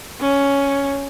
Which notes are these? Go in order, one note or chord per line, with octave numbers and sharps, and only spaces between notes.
C#4